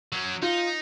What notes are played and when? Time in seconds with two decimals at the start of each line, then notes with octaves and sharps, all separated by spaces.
0.13 F#3 C#4
0.42 D#4 F4